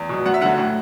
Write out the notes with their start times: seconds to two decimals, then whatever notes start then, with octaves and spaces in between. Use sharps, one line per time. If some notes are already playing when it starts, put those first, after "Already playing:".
Already playing: E2
0.09 B2 F#3
0.26 F#2 F#5
0.34 E5
0.41 D3 F#3 F#5
0.58 A2